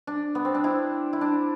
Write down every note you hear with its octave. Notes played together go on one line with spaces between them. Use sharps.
D4
B3
C4
D4
E4
E4
D4